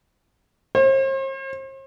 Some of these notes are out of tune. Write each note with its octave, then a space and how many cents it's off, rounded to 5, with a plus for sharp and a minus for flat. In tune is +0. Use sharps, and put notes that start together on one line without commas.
C5 +45